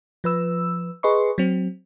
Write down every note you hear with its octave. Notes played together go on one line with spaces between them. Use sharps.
F3 B4 E6
G#4 B4 D#5 C6 C#6
F#3 C4